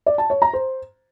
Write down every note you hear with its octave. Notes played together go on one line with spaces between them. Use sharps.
D5
A5
C#5
A#5
C5